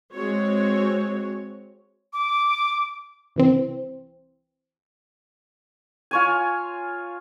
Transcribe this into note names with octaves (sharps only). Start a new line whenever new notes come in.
G#3 C4 F#4 C#5
D6
C2 E3 C4
F4 C#5 G#5